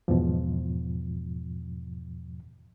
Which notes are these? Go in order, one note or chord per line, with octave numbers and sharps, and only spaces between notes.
E2 G#2 B2 F3